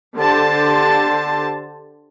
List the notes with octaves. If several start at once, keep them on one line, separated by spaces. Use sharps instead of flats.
D3 G4 C5 A5